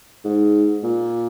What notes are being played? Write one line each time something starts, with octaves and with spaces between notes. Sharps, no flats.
G#2
A#2